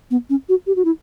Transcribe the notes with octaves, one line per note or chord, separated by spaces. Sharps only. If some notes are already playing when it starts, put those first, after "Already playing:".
B3
C#4
F#4
G4
F#4
E4